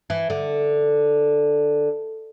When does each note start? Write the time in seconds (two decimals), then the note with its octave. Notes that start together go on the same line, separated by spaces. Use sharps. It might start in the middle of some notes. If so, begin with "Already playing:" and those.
0.10 E3
0.30 D3